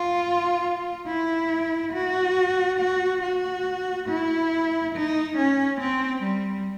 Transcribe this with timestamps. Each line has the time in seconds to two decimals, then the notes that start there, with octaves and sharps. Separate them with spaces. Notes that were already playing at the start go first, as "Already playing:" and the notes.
Already playing: F4
1.07 E4
1.93 F#4
2.79 F#4
3.22 F#4
4.08 E4
4.94 D#4
5.37 C#4
5.80 C4
6.23 G3